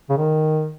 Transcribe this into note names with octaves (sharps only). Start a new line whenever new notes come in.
C#3
D#3